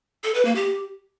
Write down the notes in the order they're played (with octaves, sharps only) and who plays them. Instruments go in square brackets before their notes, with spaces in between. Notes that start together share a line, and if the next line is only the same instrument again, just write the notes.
[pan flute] A4
B4
A#3
G4